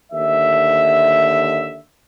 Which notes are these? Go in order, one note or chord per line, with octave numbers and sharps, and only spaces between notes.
D#2 D3 E5